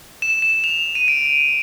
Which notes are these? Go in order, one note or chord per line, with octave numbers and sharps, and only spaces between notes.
E7
E7
F7
D#7
D7